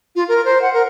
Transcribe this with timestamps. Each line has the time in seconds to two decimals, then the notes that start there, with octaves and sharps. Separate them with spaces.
0.16 F4
0.28 A#4
0.45 C5
0.62 F#5
0.74 A#4